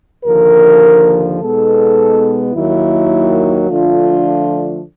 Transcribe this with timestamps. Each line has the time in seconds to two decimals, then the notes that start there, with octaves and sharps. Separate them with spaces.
0.25 D#2 D3 F3 A#4
1.40 B2 G#3 B3 D#4 A4
2.54 D#2 D#3 F#3 A#3 E4
3.68 D3 F3 A3 D4 F4